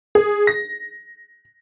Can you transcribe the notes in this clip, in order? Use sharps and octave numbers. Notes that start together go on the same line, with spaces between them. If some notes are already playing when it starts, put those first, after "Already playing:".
G#4
A#6